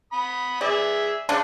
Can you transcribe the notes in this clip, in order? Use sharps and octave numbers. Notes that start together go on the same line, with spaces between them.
B5 D#6
G#4 D5 E5
C#3 C#4 D4